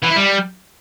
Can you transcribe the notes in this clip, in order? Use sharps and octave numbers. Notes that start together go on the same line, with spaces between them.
E3
E4
G3